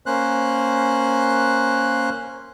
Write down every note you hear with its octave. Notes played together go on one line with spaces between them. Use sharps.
A#3 C#4 C5 F#6